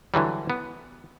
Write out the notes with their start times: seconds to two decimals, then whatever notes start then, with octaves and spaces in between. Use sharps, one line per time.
0.14 D3 E3 F#3 G3
0.50 B3